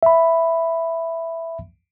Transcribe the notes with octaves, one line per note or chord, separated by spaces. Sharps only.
E5 B5